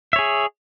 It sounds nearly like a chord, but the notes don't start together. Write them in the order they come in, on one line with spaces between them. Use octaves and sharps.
E5 C#5 G#4